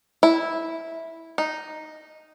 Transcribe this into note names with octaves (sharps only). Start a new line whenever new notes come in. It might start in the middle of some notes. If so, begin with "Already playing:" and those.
E4
D#4